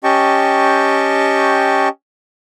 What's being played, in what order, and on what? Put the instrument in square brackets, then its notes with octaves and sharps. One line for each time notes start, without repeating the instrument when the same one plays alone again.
[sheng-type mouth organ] C#4 G4 D#5 G5 A5 C#6